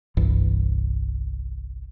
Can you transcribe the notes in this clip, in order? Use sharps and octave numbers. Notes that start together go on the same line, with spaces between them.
G1 C2 G2 E3